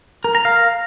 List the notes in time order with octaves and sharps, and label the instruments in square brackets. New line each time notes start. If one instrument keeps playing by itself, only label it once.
[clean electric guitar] A#4
A#5
F5